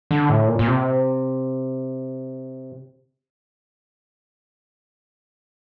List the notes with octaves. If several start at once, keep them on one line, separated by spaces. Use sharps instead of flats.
D3
A2
A#2
A#2
C3